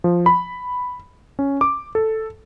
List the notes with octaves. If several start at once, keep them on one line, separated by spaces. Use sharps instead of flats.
F3
B5
C#4
D6
A4